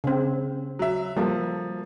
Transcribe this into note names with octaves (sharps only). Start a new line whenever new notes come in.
C#3 C4
F#3 E5
F3 G3 A#3 A4